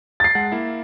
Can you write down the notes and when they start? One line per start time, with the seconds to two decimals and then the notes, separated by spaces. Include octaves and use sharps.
0.20 A6 C7
0.35 G#3 F#5 A5
0.52 A#3 E4